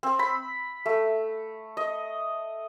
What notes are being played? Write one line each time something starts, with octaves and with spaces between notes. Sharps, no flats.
C4
B5
A3
D#5